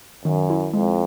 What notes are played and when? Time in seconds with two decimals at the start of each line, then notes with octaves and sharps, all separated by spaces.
0.25 F#2 D#3
0.50 E4
0.74 F2 G#3